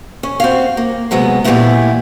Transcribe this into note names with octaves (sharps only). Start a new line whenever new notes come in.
C#4
C4 F#4 F5
A#3
C3 F#3 G#3 B3
A#2 E3 G3 A3 B3 E4